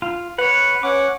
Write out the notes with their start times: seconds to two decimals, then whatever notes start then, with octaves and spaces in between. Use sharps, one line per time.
0.02 F4
0.39 B4 C#5 F#5
0.83 C#4 F#5 D6